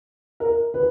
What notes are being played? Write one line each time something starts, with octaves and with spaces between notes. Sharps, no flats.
A#4
B4